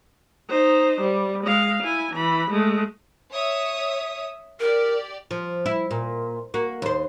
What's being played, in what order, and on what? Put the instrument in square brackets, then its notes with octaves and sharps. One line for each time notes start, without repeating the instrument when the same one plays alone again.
[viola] D#4 C5
G3
G#3 F5
E4 G#5
E3 B5
G#3 A3
[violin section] C#5 E5 D#6
[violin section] G4 D5 [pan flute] A#4
[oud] F3
E4
A#2
A#3 F#4
D#2 C5